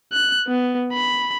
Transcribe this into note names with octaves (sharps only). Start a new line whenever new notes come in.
F#6
B3
B5